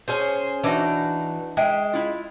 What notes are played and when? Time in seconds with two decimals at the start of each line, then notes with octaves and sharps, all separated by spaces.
0.08 C#4 G#4 C5
0.64 E3 D4 D#4 F#4
1.57 G#3 E5 G5
1.93 E4 F4